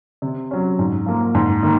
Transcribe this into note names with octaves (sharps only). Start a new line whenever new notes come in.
C3
F#3 C#4
G#2
F3 A#3
G#2
D#3 A#3